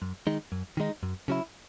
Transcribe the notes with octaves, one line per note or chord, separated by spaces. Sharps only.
F#2
D#3 G#3 D#4
F#2
D#3 G#3 D#4
F#2
C#3 F#3 C#4 E4